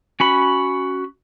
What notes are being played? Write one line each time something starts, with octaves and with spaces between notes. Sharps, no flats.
C#4 F#4 B5